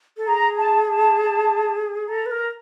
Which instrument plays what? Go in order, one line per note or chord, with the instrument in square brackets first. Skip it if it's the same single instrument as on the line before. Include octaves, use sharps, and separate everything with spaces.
[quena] A4
[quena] G#4 [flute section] A#5
[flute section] A5
A5
[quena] A4 [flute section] A#5
[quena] B4
[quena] A#4 [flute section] A#5